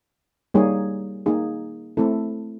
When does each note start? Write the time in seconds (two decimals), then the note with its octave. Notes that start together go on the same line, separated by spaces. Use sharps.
0.54 G3 A#3 D#4 G#4 C#5
1.26 A#3 D#4 G#4
1.97 A3 C4 E4 A4